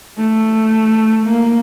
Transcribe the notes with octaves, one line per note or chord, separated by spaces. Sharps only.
A3
A#3